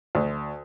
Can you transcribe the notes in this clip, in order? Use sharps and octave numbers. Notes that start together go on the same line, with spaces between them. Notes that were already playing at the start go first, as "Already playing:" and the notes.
D2